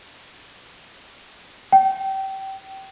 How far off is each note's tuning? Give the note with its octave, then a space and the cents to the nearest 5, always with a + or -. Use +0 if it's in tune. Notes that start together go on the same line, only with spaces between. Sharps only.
G5 -25